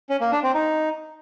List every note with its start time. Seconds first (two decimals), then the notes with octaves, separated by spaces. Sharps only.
0.10 C#4
0.21 A#3
0.32 D4
0.43 C4
0.54 D#4